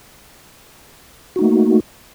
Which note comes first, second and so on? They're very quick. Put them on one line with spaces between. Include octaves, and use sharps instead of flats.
F#4 D#4 A3 A#3